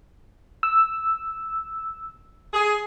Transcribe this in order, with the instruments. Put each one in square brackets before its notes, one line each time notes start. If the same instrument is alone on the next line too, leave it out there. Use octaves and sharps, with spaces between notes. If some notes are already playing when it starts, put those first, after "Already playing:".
[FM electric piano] E6
[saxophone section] G#4